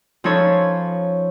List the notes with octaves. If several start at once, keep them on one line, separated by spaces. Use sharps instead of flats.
F3 C#4 D#4 A4 C#5 B5